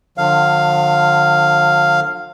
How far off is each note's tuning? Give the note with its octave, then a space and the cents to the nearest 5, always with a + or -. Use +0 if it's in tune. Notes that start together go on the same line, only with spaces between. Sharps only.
D3 +40 F3 +40 F5 +0